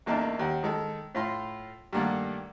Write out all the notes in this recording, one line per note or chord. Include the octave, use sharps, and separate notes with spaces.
A1 E2 A#3 D4 D#4 A5
D#2 F#5
D#3 G#3 A4
A2 F4 C6
G2 D#3 A3 A#3 D5 F#5